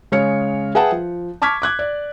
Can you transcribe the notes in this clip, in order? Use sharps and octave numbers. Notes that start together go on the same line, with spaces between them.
C#3 G#3 C#5 F6 C#7
G#4 B4 E5 F#5 G5 A5
F3
A5 C#6 D6 F6 G#6 B6
D6 F#6 G#6
D5